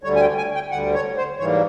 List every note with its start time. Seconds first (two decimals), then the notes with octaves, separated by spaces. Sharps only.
0.03 D2 D3 G3 C#5
0.16 G#5
0.20 G5
0.37 G#5
0.54 G5
0.71 D2 D3 G3 F#5
0.94 C#5
1.17 C5
1.39 G#2 E3 G3 A#3 C#5